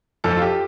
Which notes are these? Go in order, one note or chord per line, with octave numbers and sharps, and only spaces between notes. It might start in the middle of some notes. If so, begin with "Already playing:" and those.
F2 A4
F4
G4